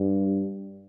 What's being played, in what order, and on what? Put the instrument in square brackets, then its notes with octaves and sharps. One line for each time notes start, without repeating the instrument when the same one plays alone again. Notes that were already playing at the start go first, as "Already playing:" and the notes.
Already playing: [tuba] G2